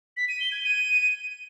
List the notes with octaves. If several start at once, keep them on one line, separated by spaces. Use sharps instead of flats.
B6
D#7
G7
G#6
D#7